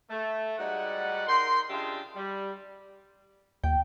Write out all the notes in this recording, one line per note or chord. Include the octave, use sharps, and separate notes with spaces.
A3
G#2 G3 D#4 F#4 D5 F#5
D#4 A#4 G5 C6
C#3 D4 F4 G4 D#5 E5
G3
D#2 G5